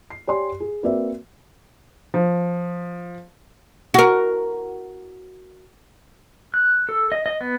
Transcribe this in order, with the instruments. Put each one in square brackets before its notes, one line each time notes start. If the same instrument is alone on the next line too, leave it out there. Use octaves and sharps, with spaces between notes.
[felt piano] C7
G4 C#5 D5 G#5 C6
G#4
A#3 C4 F#4 B4 D5 E5
F3
[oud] F#4 A#4
[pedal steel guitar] F#6
A4
D#5
D#5
B3